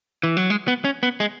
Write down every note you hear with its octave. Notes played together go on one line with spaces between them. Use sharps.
E3
F#3
G#3
B3
C#4
B3
G#3